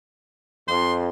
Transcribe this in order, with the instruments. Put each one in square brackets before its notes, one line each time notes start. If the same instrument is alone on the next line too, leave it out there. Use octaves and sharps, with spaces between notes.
[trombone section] F2 [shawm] C6